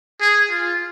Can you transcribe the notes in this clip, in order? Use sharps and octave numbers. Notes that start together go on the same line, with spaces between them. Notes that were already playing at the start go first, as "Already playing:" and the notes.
G#4
F4